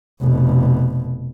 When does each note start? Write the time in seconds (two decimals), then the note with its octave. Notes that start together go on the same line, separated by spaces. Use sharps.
0.21 F1 B2